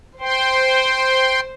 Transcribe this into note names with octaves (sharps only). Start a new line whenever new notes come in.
C5 G5 C6